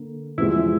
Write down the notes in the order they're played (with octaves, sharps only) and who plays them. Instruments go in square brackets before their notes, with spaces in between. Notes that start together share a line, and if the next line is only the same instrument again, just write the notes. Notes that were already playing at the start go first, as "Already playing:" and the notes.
Already playing: [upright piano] D3 A#3
[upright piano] E2 C3 F3 G#3 [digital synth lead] E4